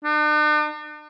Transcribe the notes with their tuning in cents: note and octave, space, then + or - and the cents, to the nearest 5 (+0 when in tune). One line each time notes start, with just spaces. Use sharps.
D4 +45